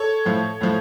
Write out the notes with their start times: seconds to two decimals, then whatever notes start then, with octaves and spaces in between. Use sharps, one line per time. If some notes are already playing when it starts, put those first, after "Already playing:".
Already playing: A4 C#5
0.25 A2 F3
0.61 A2 F3